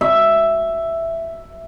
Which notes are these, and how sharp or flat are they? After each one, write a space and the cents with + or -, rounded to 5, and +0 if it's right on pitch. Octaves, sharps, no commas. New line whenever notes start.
E5 +5